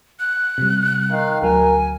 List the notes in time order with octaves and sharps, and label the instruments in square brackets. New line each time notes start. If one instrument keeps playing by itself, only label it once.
[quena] F#6
[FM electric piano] C3 G3
[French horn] D#3 [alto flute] F5
[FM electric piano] D2 F#3 [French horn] A#4 [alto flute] G#5